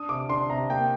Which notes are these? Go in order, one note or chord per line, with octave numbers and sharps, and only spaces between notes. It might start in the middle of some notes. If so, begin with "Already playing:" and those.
Already playing: D4 D#6
C3 D6
D4 C6
C3 A#5
A#3 G5